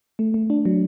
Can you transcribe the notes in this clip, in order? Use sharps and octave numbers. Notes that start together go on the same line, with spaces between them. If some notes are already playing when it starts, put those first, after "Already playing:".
A3
A3
D4
F#3